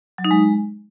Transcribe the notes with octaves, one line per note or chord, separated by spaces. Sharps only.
F#3
D#4
G#3